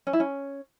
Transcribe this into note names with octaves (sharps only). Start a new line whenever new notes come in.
C#4
E4
C#4